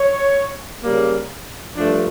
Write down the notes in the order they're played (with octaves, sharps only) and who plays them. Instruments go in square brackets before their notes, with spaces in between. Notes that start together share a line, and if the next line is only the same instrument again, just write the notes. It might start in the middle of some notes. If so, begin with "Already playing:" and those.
Already playing: [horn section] C#5
C#3 G3 A#3
G2 F3 A3 D4